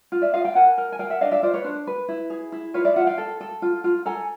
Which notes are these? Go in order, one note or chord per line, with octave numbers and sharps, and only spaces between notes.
F4
D5 E5
F4 D#5 F5
F5 G5
A#4 F#5 G#5
A#4
G#5
A#4 F5 G5
E5 F#5
D4 D#5 F5
D5 E5
F4 C5 D5
B4 C#5
D4 C5
B4
E4
G#4
E4
F4 B4 C#5
D5 E5
F4 E5 F#5
F5 G5
A4
A4
F4
F4
A4 G#5 A#5